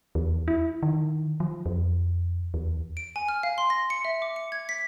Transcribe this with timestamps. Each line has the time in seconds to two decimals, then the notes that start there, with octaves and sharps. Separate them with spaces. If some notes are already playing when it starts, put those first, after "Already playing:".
0.15 E2
0.48 E4
0.83 D#3
1.40 F3
1.66 F2
2.54 E2
2.97 D7
3.16 G#5
3.28 F6
3.43 F5
3.58 C6
3.70 A#6
3.90 C#7
4.05 E5
4.22 D6
4.36 C#7
4.52 G#6
4.69 B6